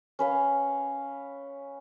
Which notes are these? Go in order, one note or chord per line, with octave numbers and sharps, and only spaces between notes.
C#4 B4 F5